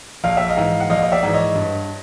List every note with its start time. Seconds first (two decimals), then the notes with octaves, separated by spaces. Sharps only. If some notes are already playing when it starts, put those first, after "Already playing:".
0.24 A#1 F5
0.37 E5
0.49 D#5 F5
0.57 G#2 E3
0.80 F#5
0.90 A#1 D#5 F5
1.02 D#5
1.12 D5 E5
1.23 G#2 E3
1.33 C#5 D#5
1.55 G2